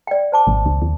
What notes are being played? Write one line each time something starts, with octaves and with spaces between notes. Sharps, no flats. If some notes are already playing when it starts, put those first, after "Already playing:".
D5 G5
C5 A5 D6
G#1
C#2
D#2